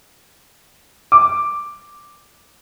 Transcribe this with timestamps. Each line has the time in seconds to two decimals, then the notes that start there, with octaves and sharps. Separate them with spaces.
1.12 D6